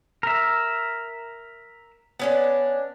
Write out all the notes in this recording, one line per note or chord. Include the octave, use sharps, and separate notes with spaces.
A#4 E5
B3 C#4 D4